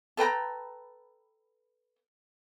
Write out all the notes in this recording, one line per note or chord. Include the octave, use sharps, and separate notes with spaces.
A4 B4 G5 A#5